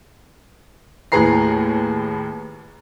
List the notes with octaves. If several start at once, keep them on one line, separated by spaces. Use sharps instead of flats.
D#2 A2 G#4 B4 A#5 C7